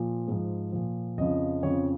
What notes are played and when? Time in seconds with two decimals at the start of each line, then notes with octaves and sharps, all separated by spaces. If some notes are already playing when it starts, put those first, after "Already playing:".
Already playing: A#2 F3
0.28 G#2 F3
0.72 A#2 F3
1.17 F2 C#3 F3 D#5
1.62 F2 C#3 F3 C#5